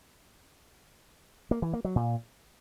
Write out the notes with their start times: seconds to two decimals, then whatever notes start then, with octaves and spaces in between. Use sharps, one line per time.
1.51 A#3
1.62 E3
1.73 A#3
1.85 F#3
1.96 A#2